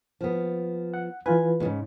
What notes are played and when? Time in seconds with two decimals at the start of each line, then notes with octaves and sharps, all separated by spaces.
0.21 F3 B3
0.94 F#5
1.26 E3 F4 B4 G#5
1.60 D#2 G#2 C#3